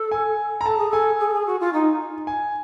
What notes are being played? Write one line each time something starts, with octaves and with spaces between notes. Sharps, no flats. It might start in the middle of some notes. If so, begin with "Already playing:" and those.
Already playing: A4
G#5
A#5
A4 A5
G#4
A4 G#5
G#4
A4
G#4
F#4
F4
D#4
G#5